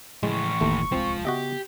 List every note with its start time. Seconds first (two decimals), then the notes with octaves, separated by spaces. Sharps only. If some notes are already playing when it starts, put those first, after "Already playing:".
0.23 A2 C#3 E3 F3 G#3 C#6
0.61 F#1 D#2 A3
0.92 D1 C2 F3 G#3 C4 F4
1.25 C#3 B3 F#4 G4 D#5 E5